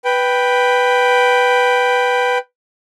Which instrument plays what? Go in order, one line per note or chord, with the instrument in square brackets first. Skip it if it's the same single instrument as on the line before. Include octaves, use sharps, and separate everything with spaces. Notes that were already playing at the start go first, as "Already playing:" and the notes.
[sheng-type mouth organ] B4 G5